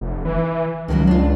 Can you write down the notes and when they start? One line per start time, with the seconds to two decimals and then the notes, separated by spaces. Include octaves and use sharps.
0.01 F1
0.25 E3
0.88 C#2 D#3 E3 F#3
1.07 D4 F4